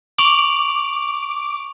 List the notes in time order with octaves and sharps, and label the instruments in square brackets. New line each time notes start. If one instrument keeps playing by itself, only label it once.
[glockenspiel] C#6 F7 F#7 [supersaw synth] D6